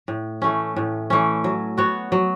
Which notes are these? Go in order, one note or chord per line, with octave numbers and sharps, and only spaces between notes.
A2
E3 A3 C#4
A2
E3 A3 C#4
F#3
B3 F#4 C#5
F#3